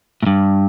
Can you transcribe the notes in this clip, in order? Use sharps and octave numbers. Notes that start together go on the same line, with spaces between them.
A2
G2